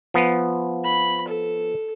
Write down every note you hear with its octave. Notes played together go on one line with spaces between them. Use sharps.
F3 B3
B5
A4